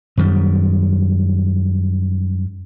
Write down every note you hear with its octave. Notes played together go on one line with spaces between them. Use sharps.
F#2 D#3 G3